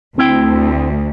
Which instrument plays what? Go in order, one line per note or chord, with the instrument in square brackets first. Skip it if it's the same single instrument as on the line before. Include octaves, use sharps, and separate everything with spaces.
[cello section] D2 [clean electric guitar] C4 E4 G5